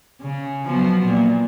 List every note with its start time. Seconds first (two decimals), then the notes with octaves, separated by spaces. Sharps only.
0.22 C#3
0.67 F3 F#3 B3
1.05 A#2